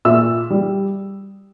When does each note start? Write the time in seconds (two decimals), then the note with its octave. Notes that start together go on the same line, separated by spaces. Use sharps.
0.05 A#2 E5 E6
0.50 G3